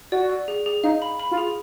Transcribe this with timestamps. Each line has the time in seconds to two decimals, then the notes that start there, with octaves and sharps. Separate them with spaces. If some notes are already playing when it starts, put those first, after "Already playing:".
0.12 F#4 D5
0.30 D5
0.48 G#4
0.66 G#4
0.84 D#4 F5
1.02 B5
1.20 B5
1.32 F4
1.38 G#4